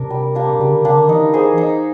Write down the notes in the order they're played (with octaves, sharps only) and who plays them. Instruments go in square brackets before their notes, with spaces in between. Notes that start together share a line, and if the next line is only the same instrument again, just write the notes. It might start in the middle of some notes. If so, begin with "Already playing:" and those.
Already playing: [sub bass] C3 [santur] D4 A#4
[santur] G3
A#3 D4 G4
[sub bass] C#3 [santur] G3
[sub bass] D3
[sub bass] C#3 [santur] A#3 D4 G4
[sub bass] D3
[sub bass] E3 [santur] D#4
[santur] G#4 C5
D#4